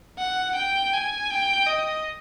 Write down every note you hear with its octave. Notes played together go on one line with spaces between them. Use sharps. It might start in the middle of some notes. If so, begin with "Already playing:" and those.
F#5
G5
G#5
G5
D#5